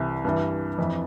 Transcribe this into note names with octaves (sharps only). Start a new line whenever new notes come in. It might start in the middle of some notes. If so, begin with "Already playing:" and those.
Already playing: C2 C3 E3
G2 E3
F2 E3